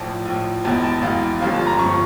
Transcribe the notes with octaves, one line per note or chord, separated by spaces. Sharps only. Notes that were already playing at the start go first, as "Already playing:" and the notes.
Already playing: A#1 A2 F3 A5
A#1 A2 F3
E1 E2 E3 A5
A5
E1 E2 E3 F5
G1 G2 F3 F5
A5
A#5
G1 G2 F3 C#6